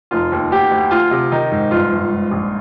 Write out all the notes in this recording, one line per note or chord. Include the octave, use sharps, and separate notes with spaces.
F1 F4
D#2
D2 G4
D2
D2 F4
C3
D#3 D#4
G#2
G1 F4
G1
G#2
A#1